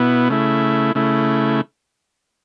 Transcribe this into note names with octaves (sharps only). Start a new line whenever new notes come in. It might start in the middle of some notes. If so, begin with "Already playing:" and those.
Already playing: B2 B3 E4
C#3 A3 E4
C#3 A3 E4